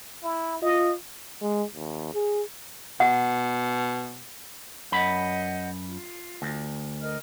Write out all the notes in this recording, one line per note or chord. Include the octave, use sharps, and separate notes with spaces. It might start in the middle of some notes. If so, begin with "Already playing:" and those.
E4
F4 D#5
G#3
D#2
G#4
B2 F#5
F#2 D#5 F#5 B5 G6
F4
D2
A#4 D#5 F6